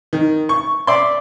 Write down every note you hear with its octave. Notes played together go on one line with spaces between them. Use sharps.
D#3
C#6
D5 E5 C6